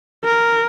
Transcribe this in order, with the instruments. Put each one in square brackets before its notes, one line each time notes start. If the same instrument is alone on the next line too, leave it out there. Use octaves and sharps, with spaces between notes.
[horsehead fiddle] A#4